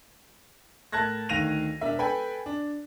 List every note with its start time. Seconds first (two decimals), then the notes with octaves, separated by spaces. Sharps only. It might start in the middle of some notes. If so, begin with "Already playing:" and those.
0.92 A2 A#4 A5 F#6 G#6 A#6
1.29 D2 D#3 F5 A#6 D#7 F7
1.81 E1 D4 A#4 E5
1.99 A4 B4 G5 G#5 B5
2.46 D4